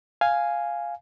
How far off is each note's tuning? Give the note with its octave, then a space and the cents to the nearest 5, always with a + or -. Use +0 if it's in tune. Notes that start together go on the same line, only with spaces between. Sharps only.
F5 +0 G#5 +0